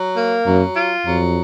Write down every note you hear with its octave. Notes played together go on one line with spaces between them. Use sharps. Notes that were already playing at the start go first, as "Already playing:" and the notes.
Already playing: F#3
A#3
F#2 F#3
F4
F2 F#3